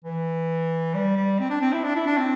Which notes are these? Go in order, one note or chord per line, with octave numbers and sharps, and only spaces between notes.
E3
G3
G3
C4
D4
C4
E4
D4
E4
D4
C4